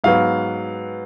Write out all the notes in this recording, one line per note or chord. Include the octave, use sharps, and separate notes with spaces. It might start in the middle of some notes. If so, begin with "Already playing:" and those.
G#2 F#3 B3 F5